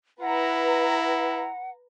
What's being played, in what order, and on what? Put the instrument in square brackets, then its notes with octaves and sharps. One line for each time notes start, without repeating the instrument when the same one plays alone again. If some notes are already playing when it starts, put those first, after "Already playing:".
[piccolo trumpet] E4 [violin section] B4 A#5 [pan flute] F#5